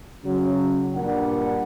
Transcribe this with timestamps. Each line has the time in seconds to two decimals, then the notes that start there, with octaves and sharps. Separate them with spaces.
0.24 C#3 F#3
0.94 G2 A#2 G3 D4 A#4 F#5